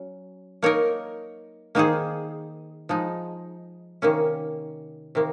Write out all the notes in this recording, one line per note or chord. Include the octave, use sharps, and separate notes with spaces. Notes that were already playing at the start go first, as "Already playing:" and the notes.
Already playing: F#3 C#4
A#3 D#4 A#4 C#5
D#3 A#3 D#4 G#4 C5
F3 G#3 D#4
C3 D#3 A#3 C#4
C3 D#3 A#3